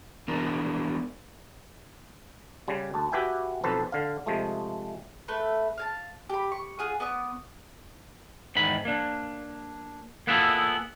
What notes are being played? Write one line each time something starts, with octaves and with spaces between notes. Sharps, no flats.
E3 B3 D4 A#4
C#3 G3
D2 A5
F#4 G4 B4 E5 G5 G#5
B1 F2 A4 B4 C5
D3 F5
C3 F3 G#3 A3
A3 B4
F5 G#5 A5
G4 B5
C#6
F4 G#4 F#5 D#6
B3 D5 C#6 D#6
E2 G#2 D#3 B5
A#3 D4
A#3 B3 E4 F4 G#4 A4